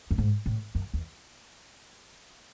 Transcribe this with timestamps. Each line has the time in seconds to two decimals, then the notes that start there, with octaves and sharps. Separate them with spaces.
0.11 F#2
0.18 G#2
0.46 A2
0.75 F#2
0.94 E2